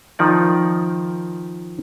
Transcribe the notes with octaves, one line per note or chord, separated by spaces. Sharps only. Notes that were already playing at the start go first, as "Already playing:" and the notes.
D#3 F3 D#4 D5